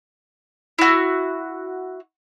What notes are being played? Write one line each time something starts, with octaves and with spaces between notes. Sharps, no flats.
E4 F#4